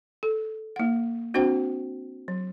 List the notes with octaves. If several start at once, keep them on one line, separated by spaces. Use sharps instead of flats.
A4
A#3 F#5
C4 D4 F#4 C5 G5
F#3